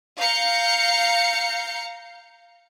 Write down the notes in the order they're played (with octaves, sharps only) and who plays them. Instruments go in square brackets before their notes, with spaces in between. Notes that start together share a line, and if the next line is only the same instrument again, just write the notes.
[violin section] F5 A#5 G6 C#7